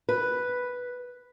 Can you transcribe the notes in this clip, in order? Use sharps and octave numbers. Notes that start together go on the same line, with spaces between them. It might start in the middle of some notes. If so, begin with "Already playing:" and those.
B4